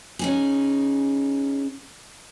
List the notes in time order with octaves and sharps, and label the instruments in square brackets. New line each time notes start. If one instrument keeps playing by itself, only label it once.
[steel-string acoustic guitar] C#4 D#4 G#4